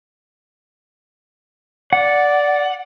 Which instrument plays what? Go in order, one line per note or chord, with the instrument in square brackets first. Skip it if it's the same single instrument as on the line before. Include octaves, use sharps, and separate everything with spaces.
[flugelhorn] D5 [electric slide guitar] F#5